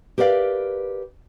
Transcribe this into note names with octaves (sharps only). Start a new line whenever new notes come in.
G4 A#4 B4 D5 F5